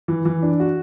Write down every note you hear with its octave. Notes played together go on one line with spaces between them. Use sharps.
E3
E3
D4
F#4